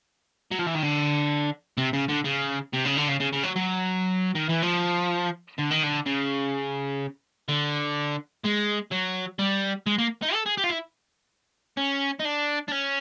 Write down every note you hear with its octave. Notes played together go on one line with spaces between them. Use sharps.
F#3
F3
E3
D#3
D3
C3
C#3
D3
C#3
C3
C#3
D3
C#3
C#3
C#3
F#3
F#3
D#3
E3
F3
D3
D#3
D3
C#3
D3
G#3
F#3
G3
G#3
A#3
D#4
A4
G#4
G4
F4
E4
C#4
D#4
D4
D4
C#4